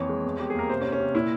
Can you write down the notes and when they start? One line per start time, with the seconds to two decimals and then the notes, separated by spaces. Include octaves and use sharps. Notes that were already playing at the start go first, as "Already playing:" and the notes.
Already playing: F2 E3 A#3 C#5
0.09 G#3
0.24 E2
0.39 E2 G4
0.50 G#4
0.55 A#3 A#4
0.69 C3 C5
0.81 C#4
0.85 C3
0.92 C#4
1.00 C3
1.15 A#2 E4